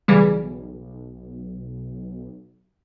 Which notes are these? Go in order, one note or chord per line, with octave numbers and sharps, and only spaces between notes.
B1 C#3 E3 G3